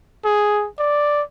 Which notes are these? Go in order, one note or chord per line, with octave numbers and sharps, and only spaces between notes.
G#4
D5